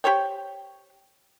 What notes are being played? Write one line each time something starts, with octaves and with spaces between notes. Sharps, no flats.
G4 C5 C#5 G5